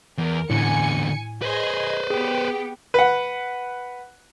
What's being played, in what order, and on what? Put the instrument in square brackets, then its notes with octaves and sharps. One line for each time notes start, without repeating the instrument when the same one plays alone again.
[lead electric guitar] E2 [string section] A#4
[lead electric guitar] E2 D3 [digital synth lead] A2 [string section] G#5 C#7
[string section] G#4 D#5 G#6 [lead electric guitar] B4 C5
[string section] B3 G4 G5 [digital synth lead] G#4
[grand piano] B4 F#5